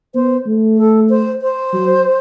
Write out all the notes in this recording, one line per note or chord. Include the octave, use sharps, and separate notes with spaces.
B3 C5
A3
A4
C5
C5
F#3